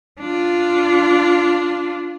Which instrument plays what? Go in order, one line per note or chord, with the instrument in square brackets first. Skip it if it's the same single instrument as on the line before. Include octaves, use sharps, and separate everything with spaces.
[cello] D4 F4